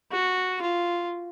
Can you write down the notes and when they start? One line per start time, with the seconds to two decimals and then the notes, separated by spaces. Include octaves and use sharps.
0.11 F#4
0.61 F4